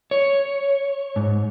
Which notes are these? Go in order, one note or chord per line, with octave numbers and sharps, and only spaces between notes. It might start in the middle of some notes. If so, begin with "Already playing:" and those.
C#5
G#2